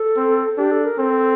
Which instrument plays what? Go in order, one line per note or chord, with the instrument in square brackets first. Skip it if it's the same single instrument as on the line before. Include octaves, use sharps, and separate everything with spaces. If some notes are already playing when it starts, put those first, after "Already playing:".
Already playing: [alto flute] A4
[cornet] C4
[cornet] D4 [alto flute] G4
[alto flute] A4
A#4
[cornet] C4 [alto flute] A4